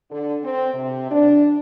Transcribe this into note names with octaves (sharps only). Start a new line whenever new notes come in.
D3
C4
C3
D4